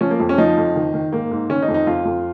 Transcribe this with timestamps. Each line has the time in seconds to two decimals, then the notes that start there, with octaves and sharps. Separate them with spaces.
0.01 F3 C#4
0.11 A#3
0.20 F2
0.29 C#4
0.38 F3 D#4
0.57 F2
0.76 D#3
0.94 D#3
1.12 G#2 A#3
1.31 G#2
1.49 D#3 C#4
1.62 D#4
1.68 F2
1.74 D#4
1.87 F2 F4
2.05 F2